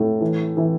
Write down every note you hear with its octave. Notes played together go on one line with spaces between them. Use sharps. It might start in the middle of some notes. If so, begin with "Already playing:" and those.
Already playing: A2
E3
E3